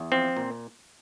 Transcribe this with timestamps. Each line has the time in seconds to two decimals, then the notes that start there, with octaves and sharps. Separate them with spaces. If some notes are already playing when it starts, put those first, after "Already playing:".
Already playing: E2
0.12 F3 C4
0.37 A#2